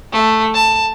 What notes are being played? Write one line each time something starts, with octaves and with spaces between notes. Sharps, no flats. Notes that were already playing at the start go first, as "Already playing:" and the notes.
A3
A5